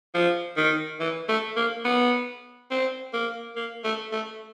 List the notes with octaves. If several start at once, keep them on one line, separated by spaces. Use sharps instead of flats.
F3
D#3
E3
A3
A#3
B3
C4
A#3
A#3
A3
A3